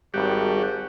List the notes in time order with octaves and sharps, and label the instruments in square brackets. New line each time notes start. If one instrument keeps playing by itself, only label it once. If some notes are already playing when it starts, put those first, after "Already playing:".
[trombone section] G#1 [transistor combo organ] G3 F#4 G4